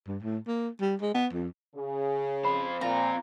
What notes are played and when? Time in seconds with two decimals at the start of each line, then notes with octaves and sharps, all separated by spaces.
0.07 G2
0.23 A2
0.47 A#3
0.81 G3
1.01 G#3
1.14 B3
1.33 F2
1.75 C#3 G#4
2.45 F2 C5 B5
2.81 A#2 C4 F4 A#5